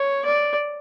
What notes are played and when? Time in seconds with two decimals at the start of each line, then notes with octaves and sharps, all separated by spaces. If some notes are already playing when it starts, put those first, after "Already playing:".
Already playing: C#5
0.25 D5